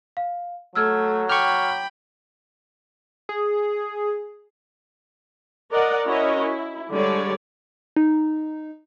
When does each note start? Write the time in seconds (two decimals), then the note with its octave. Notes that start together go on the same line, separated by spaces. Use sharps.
0.17 F5
0.75 F#3 A3 E6 F6 G#6
1.29 G5 B5 C#6 D6 F6
3.29 G#4
5.70 A#4 D5 D#5 F#5
6.06 C#4 E4 F#4 A#4 C#5 D#5
6.41 E4
6.91 D3 G3 G#3 C#5 D5
7.97 D#4